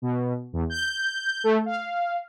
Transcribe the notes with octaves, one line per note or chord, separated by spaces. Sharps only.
B2
E2
G6
A3
F5